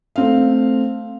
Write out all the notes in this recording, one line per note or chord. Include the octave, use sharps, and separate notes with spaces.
A3 C4 F5